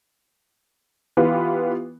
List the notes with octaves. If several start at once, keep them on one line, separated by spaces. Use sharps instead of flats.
E3 B3 F4 G4 B4